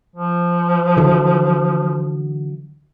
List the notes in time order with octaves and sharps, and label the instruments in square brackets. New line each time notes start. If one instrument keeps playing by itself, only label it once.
[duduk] F3
[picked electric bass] D3 E3 F#3